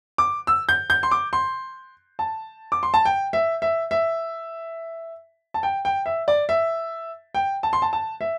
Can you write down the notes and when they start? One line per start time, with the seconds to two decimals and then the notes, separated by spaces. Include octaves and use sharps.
0.18 D6
0.47 E6
0.69 G6
0.90 G6
1.03 C6
1.11 D6
1.33 C6
2.19 A5
2.72 D6
2.83 C6
2.94 A5
3.05 G5
3.33 E5
3.62 E5
3.91 E5
5.54 A5
5.63 G5
5.85 G5
6.06 E5
6.28 D5
6.49 E5
7.35 G5
7.63 A5
7.73 C6
7.82 A5
7.93 A5
8.21 E5